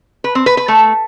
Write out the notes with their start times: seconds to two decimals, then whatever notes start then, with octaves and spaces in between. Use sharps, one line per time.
0.24 B4
0.35 C4
0.46 B4
0.57 B4
0.68 A3